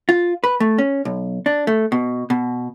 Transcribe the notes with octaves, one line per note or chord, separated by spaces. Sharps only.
F4
B4
A3
C#4
B1
D4
A3
B2
B2